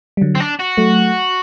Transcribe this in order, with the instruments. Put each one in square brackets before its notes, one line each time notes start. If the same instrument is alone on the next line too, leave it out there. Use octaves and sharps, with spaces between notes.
[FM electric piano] G3
D3 F#3
[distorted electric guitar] C4
D4
F#4
[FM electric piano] F#3 A3